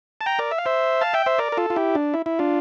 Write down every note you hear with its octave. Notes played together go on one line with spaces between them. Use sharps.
A5
G5 A#5
A#4 D5
E5
F5
C5 E5
F5 A5
E5 G5
C5 E5
A#4 D5
A#4
F4 A4
F4
E4 G4
D4
E4
E4
D4 F4